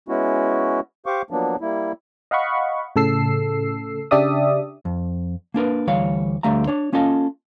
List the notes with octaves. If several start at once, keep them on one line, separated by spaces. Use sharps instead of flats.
G#3 B3 C#4 E4 F#4
G4 C5 F5 C#6 D6
F3 F#3 A#3 B3 D4
G3 A#3 E4
D#5 F5 F#5 B5 C#6
A2 C#3 A4 E6 C7
C#3 D4 G4 D5 E5 D#6
F2
A#3 D4 A#4 B4
D2 E3 G3 C#5 F5
D2 D3 G3 A3 F5 A#5
D4 C#5
A#3 C#4 F4 A4 D#5 F5